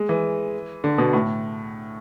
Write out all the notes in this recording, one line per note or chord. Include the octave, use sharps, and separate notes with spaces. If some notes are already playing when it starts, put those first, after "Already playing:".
Already playing: G#3
E3
D3
B2
A2